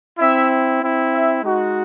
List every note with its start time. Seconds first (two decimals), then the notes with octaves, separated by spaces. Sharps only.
0.19 C4 E4 E5
0.81 C4 E4
1.12 E5
1.43 G#3 D#4 F#4